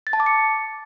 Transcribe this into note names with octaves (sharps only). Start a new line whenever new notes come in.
A6
A5
D6
C#7